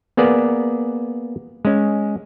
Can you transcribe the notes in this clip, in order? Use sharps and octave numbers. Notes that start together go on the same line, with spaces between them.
A#3 B3 G#4 D5
G#3 C#4